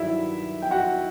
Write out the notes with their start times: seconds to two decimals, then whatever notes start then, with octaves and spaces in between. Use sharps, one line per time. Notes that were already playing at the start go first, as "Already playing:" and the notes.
Already playing: G2 D#3 F#3 E4 E5
0.62 G5
0.71 F#4 F#5